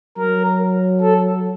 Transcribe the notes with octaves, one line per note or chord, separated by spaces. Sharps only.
F#3 A#4
A4